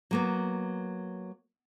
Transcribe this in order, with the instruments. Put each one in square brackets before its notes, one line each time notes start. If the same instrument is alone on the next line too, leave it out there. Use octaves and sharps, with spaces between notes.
[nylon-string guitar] F#3 A#3 B3